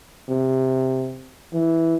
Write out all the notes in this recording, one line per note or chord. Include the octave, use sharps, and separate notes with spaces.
C3
E3